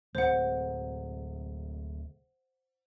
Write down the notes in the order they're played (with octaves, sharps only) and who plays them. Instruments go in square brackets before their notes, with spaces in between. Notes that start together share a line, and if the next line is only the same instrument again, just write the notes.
[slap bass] D1 C3 G#3 [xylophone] C5 F#5